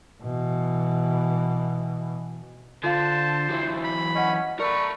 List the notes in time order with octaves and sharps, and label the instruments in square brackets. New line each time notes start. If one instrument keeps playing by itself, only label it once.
[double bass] B2 E3
[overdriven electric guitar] D3 [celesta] F4 F5 [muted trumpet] C5 [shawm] A5
[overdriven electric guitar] E3 F#3
[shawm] B5
[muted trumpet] C#4 [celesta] D#5 F#5
[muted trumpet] A3 [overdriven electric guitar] A#4 B5 [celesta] D5 [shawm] C#6